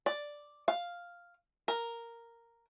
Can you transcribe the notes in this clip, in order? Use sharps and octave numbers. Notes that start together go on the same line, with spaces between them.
D5
F5
A#4